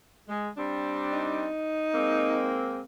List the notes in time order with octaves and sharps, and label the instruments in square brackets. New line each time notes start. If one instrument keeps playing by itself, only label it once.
[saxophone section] G#3
G3 C4 D4
[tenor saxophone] D#4
[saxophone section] G#3 A#3 C4